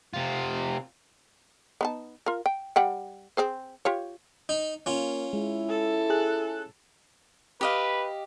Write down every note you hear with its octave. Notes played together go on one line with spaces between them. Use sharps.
C3 F4
B3 D#4 A5
F4 A#4
G5
G3 F#5 G5
C4 G#4 C5
F4 G4 C#5
D#4
A#3 C#4 F4
G#3 E4
A4
G#4 F#6
G4 B4 D#5 F5